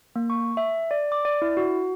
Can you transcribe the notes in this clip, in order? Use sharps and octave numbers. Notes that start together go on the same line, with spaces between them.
A#3
C#6
E5
D5
D6
D5
E4
F#4